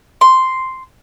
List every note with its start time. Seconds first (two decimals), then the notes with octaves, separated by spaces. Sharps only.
0.21 C6